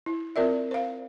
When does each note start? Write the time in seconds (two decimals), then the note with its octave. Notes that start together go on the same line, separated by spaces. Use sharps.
0.06 E4
0.36 C4 F4 A#4 D5 E5
0.71 C5 F5